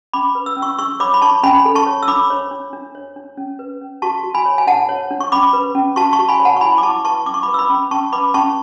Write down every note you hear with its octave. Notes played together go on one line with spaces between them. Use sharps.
C#4 B5 D6
B4
E6
C#4
C#6 E6
D4 C#6 E6
C#5 B5 D6
B5
D4 A5 C#6
C#4 G#5 B5
A4
A5 C#6
C#5
E6
D4 B5 D6
C#5
D4
D4
C#5
D4
C#4
B4
C#4
F#4 A5 C#6
F#4
G#5 B5
C#5
G#5
D4 F#5 A5
C#5
D4
C#6
C#4 B5 D6
B4
C#4
F#4 A5 C#6
A5 C#6
F#4
G#5 B5
C#5
F#5 A5
C#6
E4 G#5 B5
D6
E4 A5 C#6
B4 A5 C#6
C#4 D6
C#6
B5 D6
B4
E6
B5 D6
C#4
C#4 A5 C#6
B4 B5 D6
C#4 A5 C#6